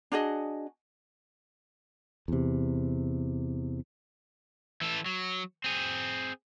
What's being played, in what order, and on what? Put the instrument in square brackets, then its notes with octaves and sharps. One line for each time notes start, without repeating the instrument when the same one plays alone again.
[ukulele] D4 F#4 G#4 D#5
[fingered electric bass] E2 C3
[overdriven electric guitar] E3 A4
F#3
C4 G#4